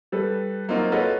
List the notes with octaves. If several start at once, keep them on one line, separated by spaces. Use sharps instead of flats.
G3 A4 B4
F#3 A#3 C4 D#4 F4 F#4
F4 F#4 A4 B4 C#5 D#5